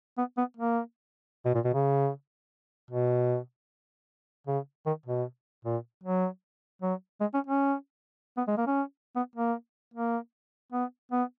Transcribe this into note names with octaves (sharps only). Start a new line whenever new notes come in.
B3
B3
A#3
B2
A#2
B2
C#3
B2
C#3
D#3
B2
A#2
F#3
F#3
G#3
C#4
C#4
B3
G#3
A#3
C#4
B3
A#3
A#3
B3
B3